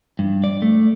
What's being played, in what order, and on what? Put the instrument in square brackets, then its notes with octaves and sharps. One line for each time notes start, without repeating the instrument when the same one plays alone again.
[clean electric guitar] G2
D5
A3